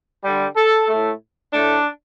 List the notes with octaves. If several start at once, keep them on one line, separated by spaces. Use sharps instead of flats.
D3 G3
A4
A2 A3
A2 A3 D4